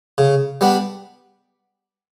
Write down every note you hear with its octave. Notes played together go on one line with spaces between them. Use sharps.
C#3
G3 B3 D4